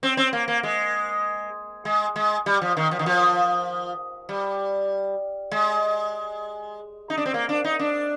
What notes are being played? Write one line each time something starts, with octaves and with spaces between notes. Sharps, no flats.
C4
C4
A#3
A#3
G#3
G#3
G#3
G3
F3
D#3
F3
D#3
F3
G3
G#3
D#4
D4
C4
A#3
D4
D#4
D4